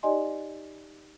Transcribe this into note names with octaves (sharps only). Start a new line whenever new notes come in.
D#4 G4 D5 D#5 G#5 C6